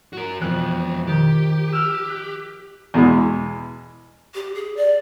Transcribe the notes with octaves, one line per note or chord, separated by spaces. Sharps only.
F#4 A#4
F2 B2 E3 F#6
D#3 G4
E6 F6
F#6
E2 B2 E3 G#3
G4
G#4
D5